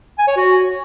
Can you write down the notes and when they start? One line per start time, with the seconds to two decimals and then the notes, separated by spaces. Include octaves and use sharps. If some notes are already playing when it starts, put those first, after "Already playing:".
0.19 G#5
0.28 C#5
0.37 F#4